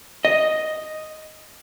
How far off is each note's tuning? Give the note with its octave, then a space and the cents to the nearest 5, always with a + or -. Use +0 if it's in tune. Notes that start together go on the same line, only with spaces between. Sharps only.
D#5 +0